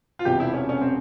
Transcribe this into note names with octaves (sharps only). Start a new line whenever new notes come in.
F4
E1 E2 C3 E3 G4
E4
C#4
C#4
C4